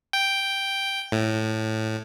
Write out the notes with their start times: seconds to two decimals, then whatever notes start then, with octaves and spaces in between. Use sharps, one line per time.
0.13 G5
1.12 A2